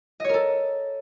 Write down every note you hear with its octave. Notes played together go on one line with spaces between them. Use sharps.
A4 A#4 C#5 D#5